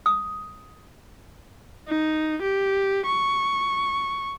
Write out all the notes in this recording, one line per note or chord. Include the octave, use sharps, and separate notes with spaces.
D#6
D#4
G4
C#6